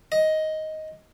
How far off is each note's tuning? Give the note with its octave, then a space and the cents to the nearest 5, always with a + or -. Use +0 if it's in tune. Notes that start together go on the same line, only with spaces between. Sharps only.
D#5 +10